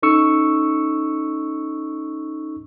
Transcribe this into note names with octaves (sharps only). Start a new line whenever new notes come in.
C#4 D#4 A4 C#6 E6 C#7